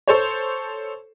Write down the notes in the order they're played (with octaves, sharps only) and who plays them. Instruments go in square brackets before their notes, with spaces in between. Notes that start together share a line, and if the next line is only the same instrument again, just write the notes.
[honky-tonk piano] A4 C5 C#5